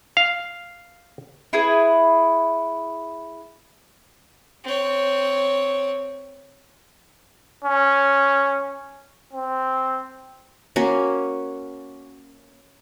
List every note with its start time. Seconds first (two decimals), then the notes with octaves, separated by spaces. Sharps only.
0.17 F5
1.53 E4 G#4 B4
4.64 C4 C#5
7.64 C#4
9.33 C4
10.76 A#3 C#4 F#4